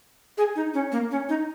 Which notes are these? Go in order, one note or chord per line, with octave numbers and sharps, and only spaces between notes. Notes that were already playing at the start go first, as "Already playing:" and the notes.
G#4
D#4
C#4
A#3
C#4
D#4